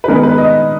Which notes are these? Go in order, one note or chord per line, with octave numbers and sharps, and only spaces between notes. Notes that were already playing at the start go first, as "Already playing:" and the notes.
B4
D#3 G#3 B3 A#4
B4
D#5